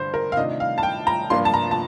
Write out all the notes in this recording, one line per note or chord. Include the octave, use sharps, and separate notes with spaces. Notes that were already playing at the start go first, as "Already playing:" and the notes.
Already playing: G2 D3 G3 C5
A#4
F5
C3 D#3 A3 D4 F4 D#5
F5
A5
G5
A#5
G2 F3 A#3 D4 F4 C6
A5
A#5
A5